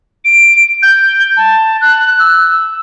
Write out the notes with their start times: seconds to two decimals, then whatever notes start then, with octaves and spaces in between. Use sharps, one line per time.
0.25 D7
0.83 G6
1.37 A5
1.81 F#6
2.19 E6